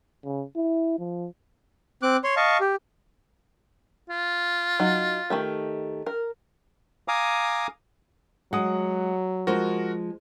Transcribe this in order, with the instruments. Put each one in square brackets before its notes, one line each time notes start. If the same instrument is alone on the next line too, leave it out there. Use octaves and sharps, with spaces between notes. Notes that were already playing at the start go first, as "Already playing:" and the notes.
[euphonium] C#3
E4
F3
[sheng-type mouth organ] C4 D6 F#6
C#5 C6
D#5 F5 A5 C#6
G4
[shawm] F4
[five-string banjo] F#3 D#4
D#3 A3 G4
A#4
[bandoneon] F5 G#5 A#5 D6 D#6
[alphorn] F#3 [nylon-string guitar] G#3 [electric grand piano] F#5 D#6
[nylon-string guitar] F3 G#3 C5 [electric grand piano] F#4 A#4